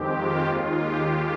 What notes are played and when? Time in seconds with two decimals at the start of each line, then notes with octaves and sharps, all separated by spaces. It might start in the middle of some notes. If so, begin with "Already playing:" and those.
Already playing: F2 D#3 G#3 C4 G4
0.15 F4
0.47 D#2 D#3 G#3
0.79 G4